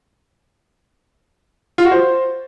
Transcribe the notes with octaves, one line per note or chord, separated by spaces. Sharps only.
F4
F#4
C5